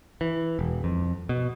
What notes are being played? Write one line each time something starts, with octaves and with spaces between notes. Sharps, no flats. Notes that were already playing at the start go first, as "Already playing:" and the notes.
E3
E1
F2
B2